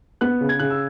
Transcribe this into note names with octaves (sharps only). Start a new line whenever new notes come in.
B3 F#6
C#3
G#6
C#3 F#6
E6